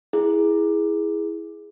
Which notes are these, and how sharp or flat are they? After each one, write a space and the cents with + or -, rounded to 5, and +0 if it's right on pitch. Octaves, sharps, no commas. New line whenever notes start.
E4 +0 G#4 +0